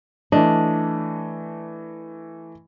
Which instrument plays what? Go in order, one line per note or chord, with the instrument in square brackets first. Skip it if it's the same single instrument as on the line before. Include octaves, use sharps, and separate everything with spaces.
[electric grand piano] E3 A3 D#5 [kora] D4